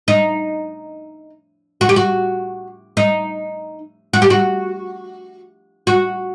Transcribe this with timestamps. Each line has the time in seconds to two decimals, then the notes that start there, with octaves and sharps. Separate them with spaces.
0.08 D#4
1.81 F#4
1.89 G4
1.96 F#4
2.97 D#4
4.13 F#4
4.22 G4
4.30 F#4
5.87 F#4